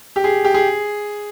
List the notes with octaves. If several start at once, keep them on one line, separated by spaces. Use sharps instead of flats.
G4
G#4
G4
G#4